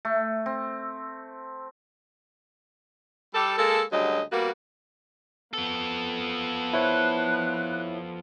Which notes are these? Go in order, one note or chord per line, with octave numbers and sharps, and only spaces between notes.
A3
C4
G3 G4 A4
G#3 A#3 A4
D2 C#3 F#3 G3 D#5
G3 A#3 B3 F#4
F3 B3 A4
E4 C5 C#5 F#6